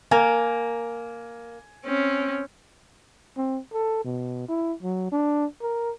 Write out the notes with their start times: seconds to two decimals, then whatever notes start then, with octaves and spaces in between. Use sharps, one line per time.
0.11 A#3 A#4 G#5
1.85 C4 C#4
3.37 C4
3.73 A4
4.04 B2
4.49 E4
4.83 F#3
5.12 D4
5.62 A#4